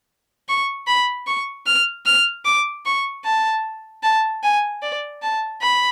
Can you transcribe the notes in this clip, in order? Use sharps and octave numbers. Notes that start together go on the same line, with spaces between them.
C#6
B5
C#6
F6
F6
D6
C#6
A5
A5
G#5
D5
A5
B5